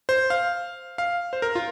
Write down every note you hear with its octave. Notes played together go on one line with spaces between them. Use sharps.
C5
F5
F5
C5
A#4
F4